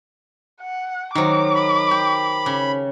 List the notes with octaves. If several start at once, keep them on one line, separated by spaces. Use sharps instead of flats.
F#5
D#3 F#3 D#4 C5 D6
B5
G4
C#3